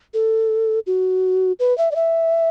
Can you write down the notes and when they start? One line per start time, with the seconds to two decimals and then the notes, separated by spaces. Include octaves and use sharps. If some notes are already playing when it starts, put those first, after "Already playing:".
0.14 A4
0.87 F#4
1.60 B4
1.78 E5
1.91 D5
1.96 E5